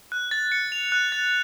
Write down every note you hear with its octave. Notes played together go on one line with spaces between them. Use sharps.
F#6
A6
C#7
F7
F#6
A6